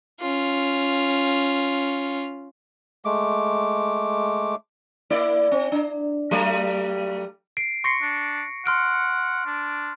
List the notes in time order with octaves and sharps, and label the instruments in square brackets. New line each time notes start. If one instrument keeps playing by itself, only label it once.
[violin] C#4 F4
[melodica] G#3 A3 D6
[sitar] A#3 E4 D5
C4
D4
F#3 G3 A3
[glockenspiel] C7 D7
[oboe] C6 [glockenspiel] C#6 A#6 C#7
[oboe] D4
[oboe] F#5 [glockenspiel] C6 F6 D7
[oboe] D4